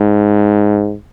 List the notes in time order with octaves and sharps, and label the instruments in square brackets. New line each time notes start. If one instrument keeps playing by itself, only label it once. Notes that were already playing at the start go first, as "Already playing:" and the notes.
Already playing: [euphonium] G#2